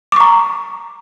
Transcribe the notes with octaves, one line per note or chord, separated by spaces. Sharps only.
A#5 C#6 D6